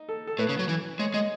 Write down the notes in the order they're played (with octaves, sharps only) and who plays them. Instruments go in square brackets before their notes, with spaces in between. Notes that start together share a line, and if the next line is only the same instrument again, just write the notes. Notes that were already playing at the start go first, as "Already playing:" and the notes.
Already playing: [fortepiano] D#4
A4
A4
[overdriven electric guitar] A2 [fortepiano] B4
[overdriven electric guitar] C#3
F#3
E3
[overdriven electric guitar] G#3 [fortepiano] C#5
[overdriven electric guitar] G#3 [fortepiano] D#5